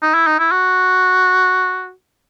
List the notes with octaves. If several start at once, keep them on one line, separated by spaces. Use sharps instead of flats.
D#4
E4
D#4
E4
F#4